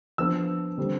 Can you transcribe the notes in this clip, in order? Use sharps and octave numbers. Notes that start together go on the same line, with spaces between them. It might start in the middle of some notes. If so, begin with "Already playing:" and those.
F3 B3 D4 E6
D3 G3 C4